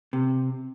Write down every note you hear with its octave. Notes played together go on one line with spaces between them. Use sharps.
C3